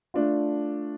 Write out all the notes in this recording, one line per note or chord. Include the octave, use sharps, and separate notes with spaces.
A3 D4 F4